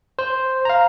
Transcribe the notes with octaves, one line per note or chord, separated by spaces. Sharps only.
C5
F5 A#5